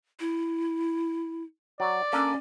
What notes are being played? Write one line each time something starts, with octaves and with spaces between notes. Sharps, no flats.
E4
F#3 D5
A#3 C#4 D4 A4